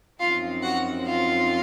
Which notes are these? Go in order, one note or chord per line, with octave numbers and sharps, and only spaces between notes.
F#2 F3 C4 D#4 F4 F5
F#4 F#5
F4 F5